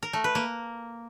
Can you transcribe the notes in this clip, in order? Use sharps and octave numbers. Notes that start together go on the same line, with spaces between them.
A#4
A3
B4
A#3